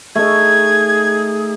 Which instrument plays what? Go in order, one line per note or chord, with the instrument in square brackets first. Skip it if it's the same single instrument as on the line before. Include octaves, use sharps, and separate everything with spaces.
[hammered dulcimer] A3 D#4 [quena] G#4 [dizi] G#6